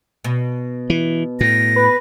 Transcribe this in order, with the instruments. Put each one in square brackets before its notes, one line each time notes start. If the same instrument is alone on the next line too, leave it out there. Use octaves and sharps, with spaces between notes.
[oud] B2
[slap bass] E3
[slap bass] A2 [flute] A#6
[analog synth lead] B4